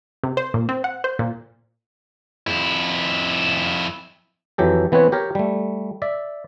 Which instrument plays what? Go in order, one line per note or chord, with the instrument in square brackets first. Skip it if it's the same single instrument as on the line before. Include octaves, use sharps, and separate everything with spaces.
[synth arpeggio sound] C3
C5
A#2
C4
F#5
C5
A#2
[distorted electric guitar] F2 E4
[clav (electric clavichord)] F2 E3 F#3 G4 A4
E3 B3 C4 B4 C#5
G4 A#4 C#5
G3 A3
D5 E5